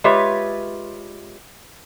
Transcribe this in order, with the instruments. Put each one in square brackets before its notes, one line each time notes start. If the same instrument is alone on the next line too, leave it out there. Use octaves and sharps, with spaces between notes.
[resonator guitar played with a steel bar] G#3 F4 G4 B4 C#5 E5